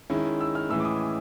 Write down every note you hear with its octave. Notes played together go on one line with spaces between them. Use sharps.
D#3 G#3 C#4 E4
E6
F6
A2 E3 G#3 C#4 E6
D6
D#6